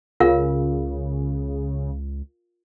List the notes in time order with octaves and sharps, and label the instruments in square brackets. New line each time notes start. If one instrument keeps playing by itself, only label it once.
[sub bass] C#2 [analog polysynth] C#3 [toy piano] F4 A#4 F5